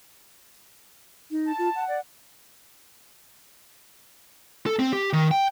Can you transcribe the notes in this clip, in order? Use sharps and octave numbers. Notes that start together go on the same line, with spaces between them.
D#4
A5
F4
F#5
D5
A4
C4
G4
D#3
G5